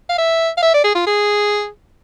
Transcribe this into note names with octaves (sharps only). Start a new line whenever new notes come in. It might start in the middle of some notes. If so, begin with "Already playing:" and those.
F5
E5
F5
E5
D5
G#4
F4
G#4